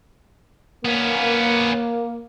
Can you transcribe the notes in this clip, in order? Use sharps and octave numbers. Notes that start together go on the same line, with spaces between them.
A#3 B3 C#4